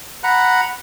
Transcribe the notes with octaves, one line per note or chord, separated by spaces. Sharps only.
F#5 A#5 B5 F#6